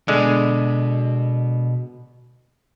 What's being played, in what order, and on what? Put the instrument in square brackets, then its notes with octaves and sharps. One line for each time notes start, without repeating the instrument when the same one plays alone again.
[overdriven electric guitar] B2 [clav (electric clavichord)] D3 G#3